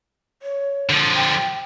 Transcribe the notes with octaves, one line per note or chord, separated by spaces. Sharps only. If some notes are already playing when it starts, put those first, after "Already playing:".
C#5
D3 F3
G5